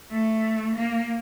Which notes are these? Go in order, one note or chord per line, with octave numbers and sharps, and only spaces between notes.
A3
A#3